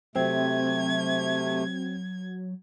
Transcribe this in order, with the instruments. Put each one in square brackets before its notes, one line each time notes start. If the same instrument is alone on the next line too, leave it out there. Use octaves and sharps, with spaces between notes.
[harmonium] C3 A3 [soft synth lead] F#3 [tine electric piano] C4 [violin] G#6